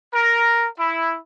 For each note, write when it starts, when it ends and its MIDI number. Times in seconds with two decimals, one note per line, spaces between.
0.14 0.66 70
0.79 1.16 64